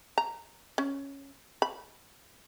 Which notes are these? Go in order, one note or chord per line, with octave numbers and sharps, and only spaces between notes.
A#5
C#4
B5